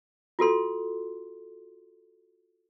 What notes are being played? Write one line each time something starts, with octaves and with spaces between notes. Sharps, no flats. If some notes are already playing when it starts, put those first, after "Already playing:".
F4 F#4 A4 C6